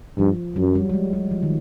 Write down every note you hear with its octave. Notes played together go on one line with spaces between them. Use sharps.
G2 F3
F#2 F#3
G3
G3
G#3
G3
F3
D#3